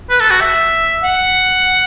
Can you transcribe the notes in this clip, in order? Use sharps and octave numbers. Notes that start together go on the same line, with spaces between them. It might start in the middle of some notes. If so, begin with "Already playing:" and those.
B4
A4
F#4
E5
F#5